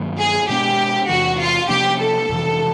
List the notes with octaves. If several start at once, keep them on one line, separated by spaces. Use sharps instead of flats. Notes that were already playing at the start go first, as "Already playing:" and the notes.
Already playing: G2 D#3 F#3 A#3
G#4
B2 G#3 B3 D4 G4
E2 C3 E3 F#4
F4
C3 F3 A#3 D4 G4
A4
F2 C3 E3